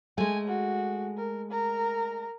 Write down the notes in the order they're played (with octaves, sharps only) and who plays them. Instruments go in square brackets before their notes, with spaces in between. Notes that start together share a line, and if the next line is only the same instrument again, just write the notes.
[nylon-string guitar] G#3 A3 [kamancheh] G#5
[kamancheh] F#4
A#4
A#4 A#5